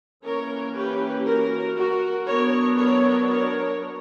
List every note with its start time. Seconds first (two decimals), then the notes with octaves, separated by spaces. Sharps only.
0.25 E3 A#3 C#4 A#4 C#5
0.75 G4 B4
1.26 F#4 A#4
1.77 F#4 A#4
2.27 F#3 B3 D4 A#4 C#5
2.78 A#4 C#5
3.29 A#4 C#5